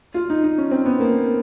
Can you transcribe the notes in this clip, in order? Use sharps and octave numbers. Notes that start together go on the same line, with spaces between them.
F4
D#4
D#4
C#4
C4
B3
A#3